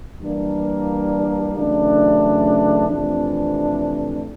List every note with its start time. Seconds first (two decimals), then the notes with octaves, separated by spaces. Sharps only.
0.22 E3 G3 A#3 D4
1.54 F#2 C#3 E3 A3 D4
2.87 F2 C3 E3 A3 D4